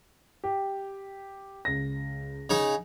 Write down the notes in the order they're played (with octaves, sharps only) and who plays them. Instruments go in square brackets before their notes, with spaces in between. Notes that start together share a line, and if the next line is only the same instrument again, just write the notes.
[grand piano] G4
C#2 A#6
[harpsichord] C#3 D#4 G#4